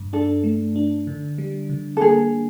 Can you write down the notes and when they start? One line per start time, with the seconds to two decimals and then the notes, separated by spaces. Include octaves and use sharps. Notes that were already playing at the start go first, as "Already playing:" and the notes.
Already playing: G2
0.13 D4 A4
0.44 A3
0.76 D4
1.07 D3
1.38 G3
1.70 D3
1.97 A4
2.01 A#3 G#4